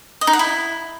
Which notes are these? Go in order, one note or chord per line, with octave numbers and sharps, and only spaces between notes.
D#5
D#4
F#5
E4